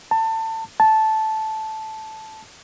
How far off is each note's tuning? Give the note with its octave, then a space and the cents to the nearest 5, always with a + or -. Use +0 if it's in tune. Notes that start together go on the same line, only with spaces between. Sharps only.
A5 +25
A5 -10